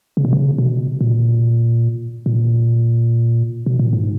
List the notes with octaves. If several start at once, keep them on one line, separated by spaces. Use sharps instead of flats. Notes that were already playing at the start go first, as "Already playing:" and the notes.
C#3
B2
C#3
B2
A#2
A#2
B2
A#2
G#2